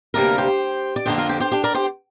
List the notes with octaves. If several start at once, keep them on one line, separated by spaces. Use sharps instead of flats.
D2 C3 G3 A#3 A#4 D5
G4 C5
D5
F2 D3 A#3 G4 C5
F4 A#4
G4 C5
G4 C5
D4 G4
A#4 D5
G4 C5